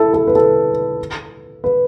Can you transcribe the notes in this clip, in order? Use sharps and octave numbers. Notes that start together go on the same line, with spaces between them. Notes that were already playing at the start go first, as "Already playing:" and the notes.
Already playing: E4 A4
A4
B4
A4
B4